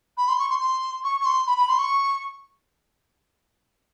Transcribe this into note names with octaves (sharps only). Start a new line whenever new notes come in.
B5
C6
C#6
C6
C6
C#6
C#6
C6
B5
B5
C6
C#6